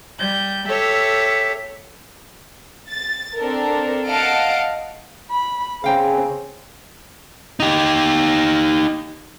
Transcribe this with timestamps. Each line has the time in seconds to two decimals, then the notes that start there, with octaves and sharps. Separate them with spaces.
0.19 G3 G6
0.68 G4 A4 C#5 E5
2.90 A6
3.38 C4 D4 A4 A#4
4.08 D#5 F5 F#5 A5 F6 D7
5.30 B5
5.84 C#3 C4 G#4 F5 G5 A#5
7.60 D#4 G4